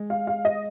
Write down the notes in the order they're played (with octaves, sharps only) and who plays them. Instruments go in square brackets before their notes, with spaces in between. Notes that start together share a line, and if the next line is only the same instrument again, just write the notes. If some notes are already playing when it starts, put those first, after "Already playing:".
Already playing: [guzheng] G#3
[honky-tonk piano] F5
F5
D#5